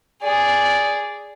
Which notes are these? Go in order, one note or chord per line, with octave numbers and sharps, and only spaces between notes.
G#4 D5